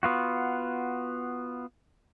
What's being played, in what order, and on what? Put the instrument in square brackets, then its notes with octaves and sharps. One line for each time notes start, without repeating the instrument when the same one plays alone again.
[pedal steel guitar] B3 F4 F#4